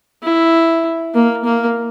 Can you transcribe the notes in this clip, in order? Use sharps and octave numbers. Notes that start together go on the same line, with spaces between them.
E4
A#3
A#3